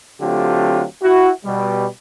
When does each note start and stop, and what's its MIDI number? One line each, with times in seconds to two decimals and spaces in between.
0.21 0.84 50
0.21 0.84 54
0.21 0.84 57
0.21 0.84 60
0.21 0.84 65
0.21 0.84 67
1.02 1.30 64
1.02 1.30 66
1.45 1.87 47
1.45 1.87 55